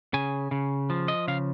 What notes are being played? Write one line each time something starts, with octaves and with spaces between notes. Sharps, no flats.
C#3 G#5
C#3
F3
D#5
C#3 F5